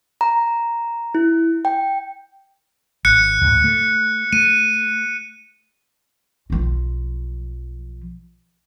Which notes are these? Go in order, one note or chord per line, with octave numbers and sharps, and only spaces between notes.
A#5
E4
G5
G#1 F#6 C#7
D2 G#2
A3
A3 D#7
B1 F3